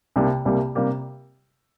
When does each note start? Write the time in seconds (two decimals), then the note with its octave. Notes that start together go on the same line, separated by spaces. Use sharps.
0.16 C2 C3 G3 A#3 G4
0.45 C2 C3 G3 A#3 G4
0.75 C3 G3 A#3 G4